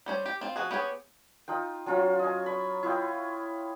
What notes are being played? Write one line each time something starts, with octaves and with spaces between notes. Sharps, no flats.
G3 C#4 C5
G4
C4 F4
F3 F#4 G#4
B3 G4 G#4 C#5
D#4 F4 G5
F#3 C#4 F4
D#5 G#5
B5 C#6
E4 F4 D#5 G5